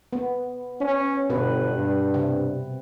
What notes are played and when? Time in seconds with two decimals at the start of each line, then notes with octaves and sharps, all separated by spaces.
0.13 B3
0.81 C#4
1.30 G1 B2 B4
1.73 G2
2.14 C3